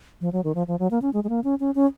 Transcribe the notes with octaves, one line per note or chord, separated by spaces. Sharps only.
F3
F#3
D#3
F3
F3
F#3
A#3
C#4
G#3
G#3
A#3
C#4
C#4
C#4